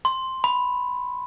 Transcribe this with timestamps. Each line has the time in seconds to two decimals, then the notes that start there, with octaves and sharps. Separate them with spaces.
0.05 C6
0.44 B5